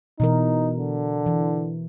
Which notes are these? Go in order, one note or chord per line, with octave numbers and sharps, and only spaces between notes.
B2 E3 D#4 A#4
D3
E3